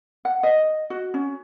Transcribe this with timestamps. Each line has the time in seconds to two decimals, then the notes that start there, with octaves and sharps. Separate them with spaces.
0.25 F#5
0.43 D#5
0.90 F#4
1.14 C#4